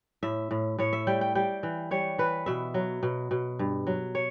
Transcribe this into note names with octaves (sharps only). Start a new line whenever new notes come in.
A2 E5
A2
A2 C#5
E5
G3 G5
G5
G3 G5
E3
G3 C#5
E3 B4
B2 E5
F#3
B2
B2
G2
F#3
C#5